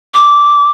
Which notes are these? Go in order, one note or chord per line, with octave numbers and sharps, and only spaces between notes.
D6